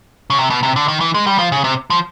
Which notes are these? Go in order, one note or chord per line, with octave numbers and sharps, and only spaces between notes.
C#3
C3
B2
C3
D3
D#3
E3
G#3
G3
F3
C#3
C3
F3